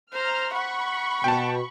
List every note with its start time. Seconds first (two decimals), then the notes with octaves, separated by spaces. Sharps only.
0.13 C5 A#5 F6
0.53 F#5 B5 C#6
1.24 B2 G5 A5